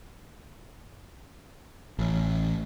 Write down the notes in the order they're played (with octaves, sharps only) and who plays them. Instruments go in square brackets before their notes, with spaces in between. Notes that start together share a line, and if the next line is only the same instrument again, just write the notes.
[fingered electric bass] A1